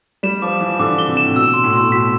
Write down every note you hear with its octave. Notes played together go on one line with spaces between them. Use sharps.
G3 E7
F3 D6
E3 E7
D3 D6
G7
C3
E7
A2
B2 E6
C6
A2
B2 C6
A2
B2 B6